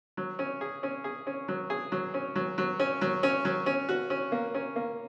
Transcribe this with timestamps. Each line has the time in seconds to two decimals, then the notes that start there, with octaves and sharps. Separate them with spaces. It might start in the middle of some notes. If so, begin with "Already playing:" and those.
0.17 F#3
0.39 C#4
0.61 G#4
0.83 C#4
1.04 G#4
1.27 C#4
1.48 F#3
1.70 G#4
1.92 F#3
2.14 C#4
2.36 F#3
2.58 F#3
2.80 C#4
3.01 F#3
3.23 C#4
3.45 F#3
3.66 C#4
3.89 F#4
4.10 C#4
4.32 A#3
4.54 C#4
4.76 A#3